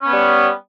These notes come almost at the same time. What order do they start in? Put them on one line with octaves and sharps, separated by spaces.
C#4 B3 G3